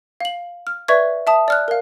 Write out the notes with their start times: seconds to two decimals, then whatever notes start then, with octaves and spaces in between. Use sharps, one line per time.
0.20 F5 F#7
0.67 F6
0.88 B4 D5 E5 C#6 G#6
1.27 E5 A5 D#6
1.48 D5 F6 F#6
1.68 A#4 F5